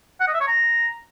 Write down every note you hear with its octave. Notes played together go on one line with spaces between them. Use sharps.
F#5
D#5
E5
C#5
A#5